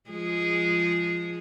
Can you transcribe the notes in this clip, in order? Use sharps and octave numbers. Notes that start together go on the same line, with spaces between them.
F3 G#3 G#4